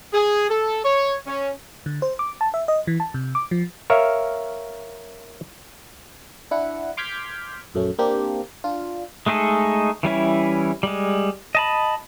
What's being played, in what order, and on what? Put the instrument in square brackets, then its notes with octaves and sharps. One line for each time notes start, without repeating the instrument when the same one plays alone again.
[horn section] G#4
A4
C#5
C#4
[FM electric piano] D3
C5
D6
A5
E5
D#5
E3
A5
C3
D6
F3
[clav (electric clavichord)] A#4 C#5 E5 F5
[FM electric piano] D4 E4 F#5
C6 D6 F6 G6 G#6 B6
A#1 F#2 A3 C#4
A#3 C4 D4 G4
D4 F4
[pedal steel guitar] G#3 A3 D#4 G#4 A4
E3 G3 C#4 E4
G3 G#3
D#5 A5 B5